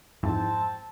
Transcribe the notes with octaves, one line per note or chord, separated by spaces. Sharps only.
F2 G#2 E3 C4 A5